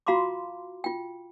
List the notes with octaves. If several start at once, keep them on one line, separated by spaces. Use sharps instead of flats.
F4 F#4 F5 A#5 C6 D6
F4 G5